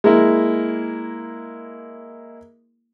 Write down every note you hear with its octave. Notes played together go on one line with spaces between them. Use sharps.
G#3 A#3 E4